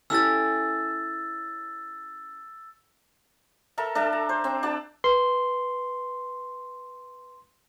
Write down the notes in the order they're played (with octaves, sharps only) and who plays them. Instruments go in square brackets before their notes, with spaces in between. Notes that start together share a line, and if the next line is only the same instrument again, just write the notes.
[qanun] C#4 E4 G4 [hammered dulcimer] A4 [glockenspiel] E6 A6
[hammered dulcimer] A4 A#4 E5
D4 A4 E5 A5
A#5
C5
C4
D4 D5 G5 A5
[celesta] B4 [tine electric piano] C6